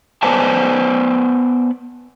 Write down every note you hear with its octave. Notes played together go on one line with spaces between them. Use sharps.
B3 B4 C5 D5 G#5 A5